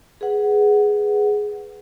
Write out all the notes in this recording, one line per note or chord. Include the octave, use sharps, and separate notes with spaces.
G#4 B4 F#5